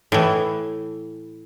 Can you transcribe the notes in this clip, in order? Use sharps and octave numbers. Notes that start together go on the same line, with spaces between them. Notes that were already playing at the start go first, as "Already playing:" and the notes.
A2 E3